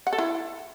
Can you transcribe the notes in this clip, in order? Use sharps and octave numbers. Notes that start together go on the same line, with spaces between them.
F#5
A4
E4